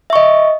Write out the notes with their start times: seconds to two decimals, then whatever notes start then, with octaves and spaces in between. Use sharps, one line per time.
0.10 E5
0.13 C#6
0.16 D#5